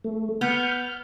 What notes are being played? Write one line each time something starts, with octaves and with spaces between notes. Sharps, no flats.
A3
B3 F6 G6